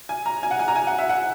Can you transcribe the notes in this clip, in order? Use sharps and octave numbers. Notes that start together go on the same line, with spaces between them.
G#5
A#5
G#5
F#5
G#5
A#5
G#5
F#5
E5
F#5